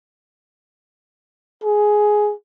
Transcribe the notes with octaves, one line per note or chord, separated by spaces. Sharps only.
G#4